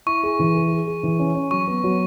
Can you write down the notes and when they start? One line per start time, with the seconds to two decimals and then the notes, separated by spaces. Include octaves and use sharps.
0.06 E4 C#6
0.23 G#4
0.39 E3
0.55 G#4
0.71 G#4
0.87 G#4
1.03 E3
1.19 C#4
1.35 C#4
1.51 F#3 C#6
1.67 B3
1.84 F#3